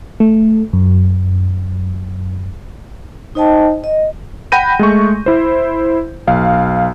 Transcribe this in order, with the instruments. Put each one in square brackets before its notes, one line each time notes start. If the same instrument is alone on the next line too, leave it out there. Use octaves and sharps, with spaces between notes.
[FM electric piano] A3
F#2
[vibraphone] D#4 C5 D#5 G5 A5
D#5
[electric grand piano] F#5 G5 B5 G6 A#6 D#7
G#3 A3 C#6
E4 C5
B1 F5